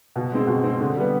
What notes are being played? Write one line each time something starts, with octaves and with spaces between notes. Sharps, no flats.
B2
G#3 C4
B2
G#3 C4
D3
G3 B3